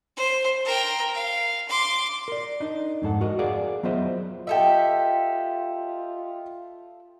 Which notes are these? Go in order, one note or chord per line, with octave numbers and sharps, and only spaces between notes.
C5
A#4 G5
F5
C6 D6
A#4 D5
D4 D#4
F2 G#2 A4 F#5
F#4 A#4 D#5
G#4 A#4 D5 F5 F#5
F#3 B3 F4 C5 D#5 E5
F4 G4 A4 D#5 E5 G5